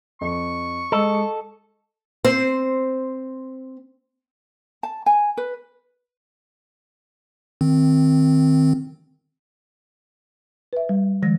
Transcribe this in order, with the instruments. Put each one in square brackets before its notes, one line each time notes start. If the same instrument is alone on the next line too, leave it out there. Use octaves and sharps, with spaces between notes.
[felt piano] F2 [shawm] C#6
[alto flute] G#3 [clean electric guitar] A4 [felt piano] D#5
[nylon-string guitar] C4 C5
[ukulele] A5
G#5
B4
[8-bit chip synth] D#3 C4
[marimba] B4 E5
G3
D#3 F3 G#3 A#6